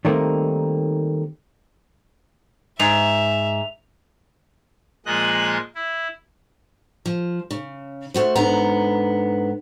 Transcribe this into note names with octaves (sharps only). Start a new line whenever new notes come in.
D#3 G3 A3 A#3 C4 D#4
G#2 E5 F7
A#2 F3 G#3 D#5 F#6
E4
F3
C#3
A3 F#4 C5
G#2 D3 B3 A#5